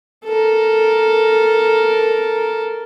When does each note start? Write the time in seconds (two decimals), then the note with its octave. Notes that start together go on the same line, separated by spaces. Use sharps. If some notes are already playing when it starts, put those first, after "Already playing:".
0.26 A4 A#4